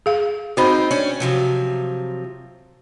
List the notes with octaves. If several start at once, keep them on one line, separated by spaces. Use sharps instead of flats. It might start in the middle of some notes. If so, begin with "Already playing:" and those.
G#4 F5
C4 D#4 F#4 C5 B5
C#4 D4
C3 F3 F#3